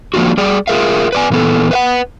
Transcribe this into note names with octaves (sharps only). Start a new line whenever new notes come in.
F3 A#3 D4 F4 F#4
G3 G#4 D5
F4 G#4 A#4 E5 F5
B4 D5 G#5
A#2 E3 B3 A4
B4 E5 F#5